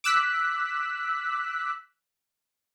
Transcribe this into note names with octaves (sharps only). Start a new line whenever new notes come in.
D6 E6 F#6 B6